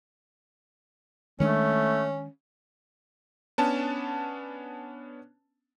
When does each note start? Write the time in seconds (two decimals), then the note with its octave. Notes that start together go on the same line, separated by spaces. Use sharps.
1.40 D#3 G#3 A3 C#4 D4
3.58 B3 C#4 D4 A5